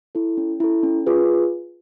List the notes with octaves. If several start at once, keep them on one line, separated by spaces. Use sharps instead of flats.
E4 A4
C#4
E4 A4
C#4
F4 G#4 B4